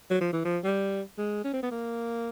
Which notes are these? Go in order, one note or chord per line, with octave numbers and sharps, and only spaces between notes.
F#3
F3
E3
F3
G3
G#3
C#4
C4
B3
A#3